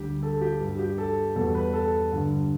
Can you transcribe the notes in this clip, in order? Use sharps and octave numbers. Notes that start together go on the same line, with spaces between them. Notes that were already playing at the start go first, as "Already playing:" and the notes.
Already playing: D2 D3 G3 G4
A4
G4
G2 G3
G4
A4
E2 B2 G3 A4
B4
A4
G2 D3 G3